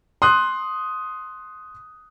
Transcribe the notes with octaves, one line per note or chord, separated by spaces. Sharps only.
C6 D#6 F#6